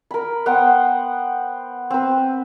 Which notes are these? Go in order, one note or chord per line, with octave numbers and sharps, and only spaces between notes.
A#4 B5
B3 C5 F#5 G5
C4 B4